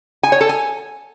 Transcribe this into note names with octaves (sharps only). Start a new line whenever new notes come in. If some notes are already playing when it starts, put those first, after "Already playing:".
G#5
C#5
A4
G#5